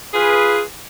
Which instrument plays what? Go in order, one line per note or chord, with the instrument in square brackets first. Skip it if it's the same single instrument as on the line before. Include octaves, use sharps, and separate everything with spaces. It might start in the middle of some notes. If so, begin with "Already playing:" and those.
[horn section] F4 G#4 B4